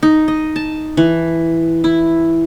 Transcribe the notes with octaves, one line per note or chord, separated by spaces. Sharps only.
D#4
D#5
A5
E3
E4